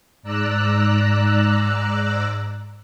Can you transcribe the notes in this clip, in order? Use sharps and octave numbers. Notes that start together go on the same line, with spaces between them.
G#2 D5 A#5 E6 F#6